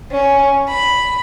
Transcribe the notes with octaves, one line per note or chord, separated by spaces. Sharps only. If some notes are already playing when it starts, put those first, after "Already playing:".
C#4
B5